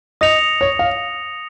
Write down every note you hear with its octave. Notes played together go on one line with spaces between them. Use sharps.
D#5 D#6 A#6 C#7 F7
C#5
F5